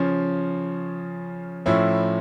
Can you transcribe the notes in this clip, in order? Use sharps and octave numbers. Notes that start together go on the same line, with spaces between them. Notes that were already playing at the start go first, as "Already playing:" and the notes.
Already playing: C#3 F3 C#4
A2 F3 C#4 E4